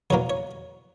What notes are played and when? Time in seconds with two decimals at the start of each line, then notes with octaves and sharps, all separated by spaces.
0.10 E2 B2 F#3 A#3 C#5
0.30 C#5